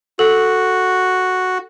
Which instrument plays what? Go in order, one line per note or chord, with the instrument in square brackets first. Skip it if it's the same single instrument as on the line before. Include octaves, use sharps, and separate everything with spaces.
[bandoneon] F#4 [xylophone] A4